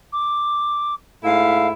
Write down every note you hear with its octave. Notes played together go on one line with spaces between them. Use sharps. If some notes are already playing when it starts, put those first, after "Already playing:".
D6
G#2 A3 E4 F5